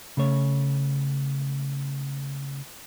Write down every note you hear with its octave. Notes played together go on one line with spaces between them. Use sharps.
C#3 A3 C#5